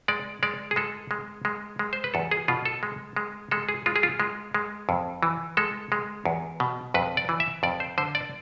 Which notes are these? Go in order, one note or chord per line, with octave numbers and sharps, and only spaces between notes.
G#3 D5
G#3 D5
G#4
G#3 A4
G#3
G#3
G#3
C5
B4
E2 A4
G#4
B2 F4
A4
G#3
G#3
G#3 A4
G#4
G#3 F4
G#4
F4
G#3
G#3
F2
E3
G#3 A4
G#3
E2
B2
F2 B4
D5
E3
E5
F2 D5
C5
D3 C5
D5